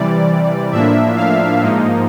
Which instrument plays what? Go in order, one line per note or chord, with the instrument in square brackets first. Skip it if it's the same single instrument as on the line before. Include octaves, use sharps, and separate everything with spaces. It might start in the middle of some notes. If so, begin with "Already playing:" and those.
Already playing: [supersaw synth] C3 E3 G3 D5
A2 F3 A#3 D4 E5
F5
G#2 F3 A#3 D#4